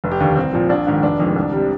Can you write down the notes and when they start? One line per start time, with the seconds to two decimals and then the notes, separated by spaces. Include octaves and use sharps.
0.04 F1
0.11 G4
0.20 D#2 D3
0.36 C2 C4
0.53 A#2 F3
0.69 A#1 D4
0.87 G#2 D#3
1.02 F1 D4
1.20 F2 D#3 G#3
1.36 C2
1.52 C3 G3